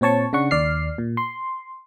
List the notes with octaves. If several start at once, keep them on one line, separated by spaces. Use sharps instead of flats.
A#2 C4 C#5 A5 C#6
C#3 D4 F#5 C#6
D#2 D5 F6 C7
A#2
C6